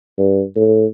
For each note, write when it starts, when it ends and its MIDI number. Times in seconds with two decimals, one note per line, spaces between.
0.18 0.43 43
0.56 0.85 45